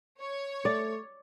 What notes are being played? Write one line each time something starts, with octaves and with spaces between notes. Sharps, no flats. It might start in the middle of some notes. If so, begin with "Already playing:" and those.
C#5
A3 D5